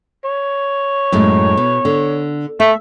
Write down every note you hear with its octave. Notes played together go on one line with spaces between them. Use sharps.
C#5
F#2 A2 G#3
B2
D3
A3 E5